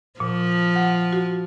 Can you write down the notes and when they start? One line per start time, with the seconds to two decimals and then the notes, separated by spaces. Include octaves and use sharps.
0.20 A#2 F3
0.75 F#5
1.13 F#4